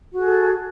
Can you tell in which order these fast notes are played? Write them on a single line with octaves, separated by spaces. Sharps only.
F#4 G#4 A4